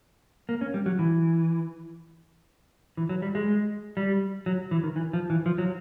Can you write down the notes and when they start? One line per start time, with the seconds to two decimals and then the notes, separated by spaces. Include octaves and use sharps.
0.49 A#3
0.61 C#4
0.74 G3
0.86 F#3
0.99 E3
2.97 E3
3.09 F#3
3.22 G3
3.35 G#3
3.97 G3
4.46 F#3
4.71 E3
4.83 D#3
4.96 E3
5.13 F3
5.30 E3
5.46 F3
5.58 F#3